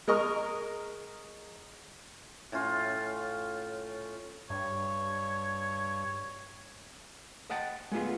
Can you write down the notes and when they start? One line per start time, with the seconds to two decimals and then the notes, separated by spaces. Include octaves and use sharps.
0.08 G#3 A#4 D#5 A#5 C#6 F6
2.52 A2 C#4 F4
4.50 G2 C#5
7.50 D#5 F#5 G5 A5
7.92 G#3 A3 B3 F4 G#4